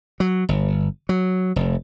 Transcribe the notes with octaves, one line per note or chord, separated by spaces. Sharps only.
F#3
G1
F#3
F1